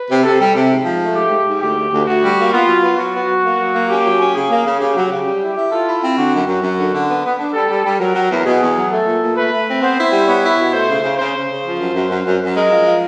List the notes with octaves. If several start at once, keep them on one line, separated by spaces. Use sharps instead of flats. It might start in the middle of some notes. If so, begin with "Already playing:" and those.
Already playing: B4
C3
C3 A4
G3
C3
G#2
F3
A3
G#2 G4
G#2
G#2
D2 G4
D2
D2
D2 F#4
G3
A#3
B3 F4
F#3
B3
F#3 F#4
B3
F#3
A#3
F#3
A#3
C#4 G4
F#3
C#4
C#3 G#4
A#3
C#3
C#3 G4
F#3
C#3
G3
E4
E4
F4 A4
E4
C4
D3 F#4
F#2
F#2
F#2
D3
D3
B3
B3
D4
G3 A4
G3
G3
F#3 A#4
F#3
E2
B2 G#4
E2
F#3
A3 A4
A#2
A#2
A3 B4
A3
C4
B3 C5
E4
G3
B3 C#5
E4
B2
A3 C5
C#3
C#3
C#3 C5
C#3
C#3
F3
F#2
F#2
F#2
F#2
F#2
G#3 A#4
F3
F3